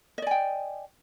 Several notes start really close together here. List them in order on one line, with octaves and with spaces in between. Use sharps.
D#5 D5 G#5 G5